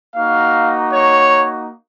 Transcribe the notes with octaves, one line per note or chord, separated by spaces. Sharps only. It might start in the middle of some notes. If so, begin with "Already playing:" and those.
A#3 D#4 F#4 F5
C#5